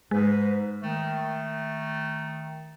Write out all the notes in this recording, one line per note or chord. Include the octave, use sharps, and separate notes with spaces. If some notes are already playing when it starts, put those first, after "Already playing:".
G#2 G#3 B4
D#3 A3